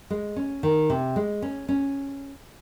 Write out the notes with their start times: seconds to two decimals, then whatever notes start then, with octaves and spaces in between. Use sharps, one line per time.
0.10 G#3
0.36 C#4
0.63 D#3
0.90 C3
1.16 G#3
1.42 C#4
1.69 C#4